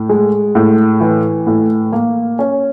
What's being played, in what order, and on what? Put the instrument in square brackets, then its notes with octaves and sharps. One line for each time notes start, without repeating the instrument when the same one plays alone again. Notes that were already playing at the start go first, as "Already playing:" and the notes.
Already playing: [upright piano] A2
G#3
A2
E3
A2
A#3
C#4